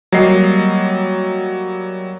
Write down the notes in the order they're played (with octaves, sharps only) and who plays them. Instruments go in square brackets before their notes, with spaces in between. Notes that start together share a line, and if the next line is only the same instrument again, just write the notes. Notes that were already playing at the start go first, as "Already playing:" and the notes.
[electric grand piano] F#3 G3 A#3 D#5 C7